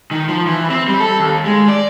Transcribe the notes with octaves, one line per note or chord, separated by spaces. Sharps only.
D#3
F3
E3
C4
G3
A4
D#2
G#3
D5